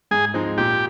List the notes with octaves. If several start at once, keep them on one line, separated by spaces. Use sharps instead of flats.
G#2 G#4
F3 G#3 C4 D#4
A#2 G4